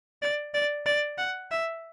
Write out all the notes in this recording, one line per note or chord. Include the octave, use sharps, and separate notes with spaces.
D5
D5
D5
F#5
E5